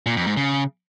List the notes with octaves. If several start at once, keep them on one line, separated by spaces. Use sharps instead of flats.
A#2
F2
G#2
C#3